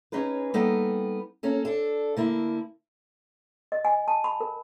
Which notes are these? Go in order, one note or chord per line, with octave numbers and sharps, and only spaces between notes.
C#4 D#4 G#4 B4
G3 A#3 B3 D#4 A4
A#3 C#4 A4
D4 A4
D3 A#3 E4
D#5
G#5
A5
B5
A#4